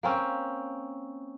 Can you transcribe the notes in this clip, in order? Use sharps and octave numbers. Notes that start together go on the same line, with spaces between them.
A#3 C4 C#4